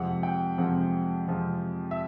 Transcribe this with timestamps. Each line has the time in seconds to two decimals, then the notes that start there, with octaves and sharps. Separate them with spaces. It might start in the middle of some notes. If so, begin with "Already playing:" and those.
Already playing: F2 C3 F3 G#3 F#5
0.23 G5
0.58 F2 C3 F3 G#3 F#5
1.28 F2 C3 F3 G#3
1.91 E5